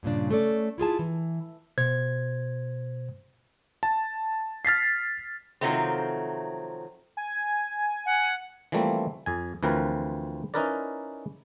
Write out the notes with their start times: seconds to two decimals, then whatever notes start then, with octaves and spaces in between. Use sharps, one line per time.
0.03 G2 A#2 C#3 D4
0.31 A3 C#4 A4 D5
0.78 E4 F4 G#4 A5
0.99 E3
1.78 B2 C5 G#6
3.83 A5
4.65 F6 A6 B6 C7
5.61 C3 D#3 F3 F#3 A3 C4
7.17 G#5
7.35 G#6
8.06 F#5
8.72 E3 F3 G3 A3 A#3 C4
9.26 F2 G#5
9.63 D2 E3 F3 C4 A#4 B4
10.54 C#4 D#4 E4 A#4 B4 D5